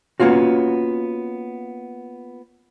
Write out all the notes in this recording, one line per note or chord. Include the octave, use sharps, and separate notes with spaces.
A#3 B3 C#4 F4 F#4